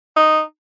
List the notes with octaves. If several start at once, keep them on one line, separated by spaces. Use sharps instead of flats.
D#4